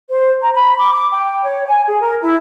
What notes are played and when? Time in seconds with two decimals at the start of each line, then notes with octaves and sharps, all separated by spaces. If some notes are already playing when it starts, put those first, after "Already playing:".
0.10 C5
0.41 A#5
0.54 B5
0.77 D6
0.93 D6
1.12 G5
1.44 C#5
1.67 G#5
1.88 G#4
2.01 A#4
2.22 E4